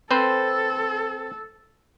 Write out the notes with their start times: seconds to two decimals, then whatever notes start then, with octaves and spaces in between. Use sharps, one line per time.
0.11 C4 A4 B4 C5